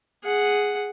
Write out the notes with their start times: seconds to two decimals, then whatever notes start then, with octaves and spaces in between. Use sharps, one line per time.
0.23 G#4 F#5